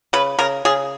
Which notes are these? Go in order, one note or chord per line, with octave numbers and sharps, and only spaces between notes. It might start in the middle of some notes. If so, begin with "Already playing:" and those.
C#3 B4
C#3 A#4
C#3 G#4